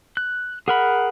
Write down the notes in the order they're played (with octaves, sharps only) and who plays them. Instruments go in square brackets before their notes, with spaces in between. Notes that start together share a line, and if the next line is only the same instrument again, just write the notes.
[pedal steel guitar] F#6
[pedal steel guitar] G#4 A#4 B5 [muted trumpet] F#5